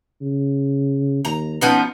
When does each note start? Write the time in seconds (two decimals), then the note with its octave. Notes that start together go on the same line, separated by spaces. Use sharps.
0.21 C#3
1.25 D#2 A#5
1.61 F3 B3 C#4 D#4